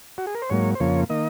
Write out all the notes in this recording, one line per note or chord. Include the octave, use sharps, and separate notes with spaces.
F#4
G#4
A#4
C5
G#2 F#3 A#3 C#5
C5
F2 C#3 F3 A#3 C#5
D#3 A#3 D#5